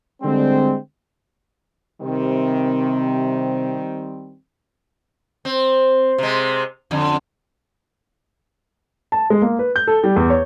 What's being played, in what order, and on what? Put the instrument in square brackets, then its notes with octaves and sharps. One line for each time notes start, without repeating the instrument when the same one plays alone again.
[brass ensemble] D3 G3 G#3 C4
[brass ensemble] C3 [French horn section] D#3 G3 C4
[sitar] C4
C3 G#3
F2 D3
[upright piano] A5
G#3
A#3
B4
G6
A4
G3
E2
C#5